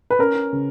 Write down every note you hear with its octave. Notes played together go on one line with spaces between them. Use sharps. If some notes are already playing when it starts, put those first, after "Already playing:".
B4
C#4 A#4
C#3